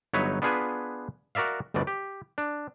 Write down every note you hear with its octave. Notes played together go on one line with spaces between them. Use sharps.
G1 F#3 D#4 B4 C#5 E5
B3 D4 F4 G#4 B4 G#5
F#4 A#4 D5 E5 F5
G1 D2 B2 D5
G4
D4